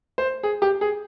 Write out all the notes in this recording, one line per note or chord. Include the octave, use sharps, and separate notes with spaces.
C5
G#4
G4
G#4